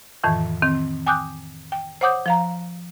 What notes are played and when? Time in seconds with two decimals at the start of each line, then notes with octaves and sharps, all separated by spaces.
0.24 F2 A2 D#3 E3
0.62 D#3 C4
1.06 G5 G#5 D6 D#6 F#6 G6
1.72 G5
2.01 C5 C#5 F#5 D6 D#6 G6
2.26 F3 F5 A#5